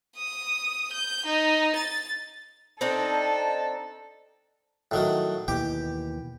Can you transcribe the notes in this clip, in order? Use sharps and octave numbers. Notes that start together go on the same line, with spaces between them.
D#6
G6
D#4
A6
C4 D4 D#4 A4
A2 D#3 F#3
D#2 B2 E3 G4